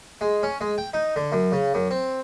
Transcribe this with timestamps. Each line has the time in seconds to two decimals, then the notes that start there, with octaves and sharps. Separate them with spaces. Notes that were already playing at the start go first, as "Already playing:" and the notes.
0.21 G#3
0.43 C#4
0.61 G#3
0.78 G5
0.94 D#4
1.16 D3
1.32 F#2
1.52 C#3
1.74 F#2
1.91 C4